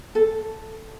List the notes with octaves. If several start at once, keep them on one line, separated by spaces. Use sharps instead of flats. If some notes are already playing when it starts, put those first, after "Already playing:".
A4